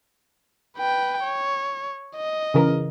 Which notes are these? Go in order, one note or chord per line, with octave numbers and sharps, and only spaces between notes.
B4 G5
C#5
D#5
C#3 E3 A#4